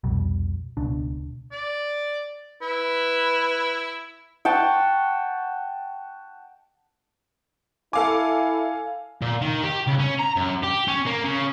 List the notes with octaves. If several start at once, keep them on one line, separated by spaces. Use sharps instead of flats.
C2 F2 B2 G3
D#1 C#2 B2 D4
D5
E4 B4
F#5 G5 A5 C#6
E4 A4 F5 G#5 D6
A#2
D#3
G4
C#2
C#4
A#5
F#2
G4
C#4
A#3
C#3